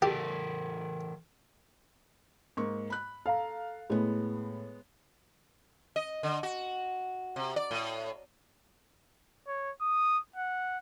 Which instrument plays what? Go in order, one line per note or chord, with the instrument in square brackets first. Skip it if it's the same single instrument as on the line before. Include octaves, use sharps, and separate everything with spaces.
[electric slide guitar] E3 A4 A#4 [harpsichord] G4
[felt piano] G#2 A#3 C#6
B5 F#6
[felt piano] A4 [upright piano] F5 A#5
[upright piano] A2 [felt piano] G#3 B3
[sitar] D#5
D3
F#4
C3
D5
A2
[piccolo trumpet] C#5
D#6
F#5